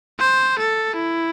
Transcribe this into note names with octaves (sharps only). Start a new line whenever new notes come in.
C5
A4
E4